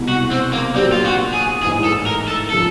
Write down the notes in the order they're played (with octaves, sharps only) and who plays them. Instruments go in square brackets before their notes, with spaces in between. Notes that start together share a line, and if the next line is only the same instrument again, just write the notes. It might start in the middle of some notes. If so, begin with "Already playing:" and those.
Already playing: [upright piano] C2 B2 G#3
[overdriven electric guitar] F#4
C4
A#3
[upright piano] A#2 F#3 A#3 D4 G4 [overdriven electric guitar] C4
[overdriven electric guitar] F4
F#4
G#4
[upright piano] A1 G#2 E3 [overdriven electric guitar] G#4
[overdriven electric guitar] A4
A#4
A4
[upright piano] C#3 F3 [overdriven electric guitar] A4